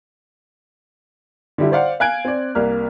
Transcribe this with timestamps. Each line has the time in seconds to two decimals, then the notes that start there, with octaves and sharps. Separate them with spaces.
1.58 D3 G3 E4
1.72 C5 D5 F5 F#5
2.00 F5 G#5 F#6 G#6 D7
2.25 C4 D5
2.55 C2 A#3 F6